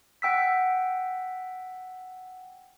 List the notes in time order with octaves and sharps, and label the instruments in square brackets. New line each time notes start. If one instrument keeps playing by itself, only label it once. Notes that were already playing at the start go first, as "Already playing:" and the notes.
[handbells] F#5 G5 E6 B6